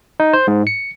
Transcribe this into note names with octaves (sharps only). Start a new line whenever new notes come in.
D#4
C5
G#2
C#7